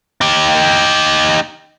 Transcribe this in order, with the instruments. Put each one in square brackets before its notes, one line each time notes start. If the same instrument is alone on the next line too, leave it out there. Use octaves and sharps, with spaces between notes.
[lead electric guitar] D#4 G4